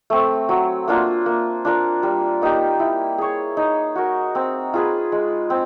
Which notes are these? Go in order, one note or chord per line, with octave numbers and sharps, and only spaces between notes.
A3 C4
F#3
A#3 D4 F4
A#3
D4 F4 A#4
G3
A#3 D#4 G4
E4
G#4 C#5
D#4
F#4 A#4
C4
F4 G#4 B4
G#3
C4